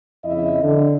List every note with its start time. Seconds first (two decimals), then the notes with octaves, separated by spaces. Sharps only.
0.25 F2 C#3 E4 D#5 E5
0.64 D3